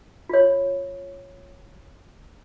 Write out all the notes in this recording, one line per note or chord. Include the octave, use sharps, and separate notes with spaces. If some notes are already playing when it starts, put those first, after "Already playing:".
F4 C#5